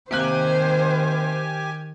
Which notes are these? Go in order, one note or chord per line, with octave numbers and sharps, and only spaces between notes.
C3 D#3 A#3 G4 C5 G#5 F#6